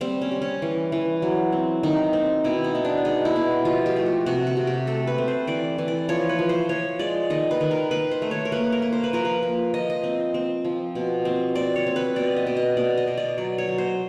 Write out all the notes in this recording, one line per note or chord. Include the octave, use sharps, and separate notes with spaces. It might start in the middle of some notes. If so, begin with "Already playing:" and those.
G3 C4
C#4
G3
C#4
E3
E3
F#3
C4
D#3 D#4
C4
B2 E4
D#4
B3
D4
G#3 D#4
E4
B2
F3 F4
G4
A3
F#4
C3 F#4
F#4
C3
G4
A3 A4
B4
C4
C5
E3 D5
E3
D5
F3 C#5
B4
F3
C5
F3 C#5
G#3 D5
D#3 D#5
B4
D#3
A#4
D#3 B4
C5
A3
C#5
A#4
A#3 B4
A#4
A#3
C5
B4
F3 A#4
B4
A#3
F3 D#5
D#5
C4
C4
F3
B2
C4
C4 D5
C#5
C4
B4
B2 D5
D#5
B2
D#5
B2 D5
D#5
B2
D5
F#3 D5
C#5
F#3
C5